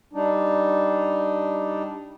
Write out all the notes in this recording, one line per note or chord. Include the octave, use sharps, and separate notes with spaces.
G3 D4 D#4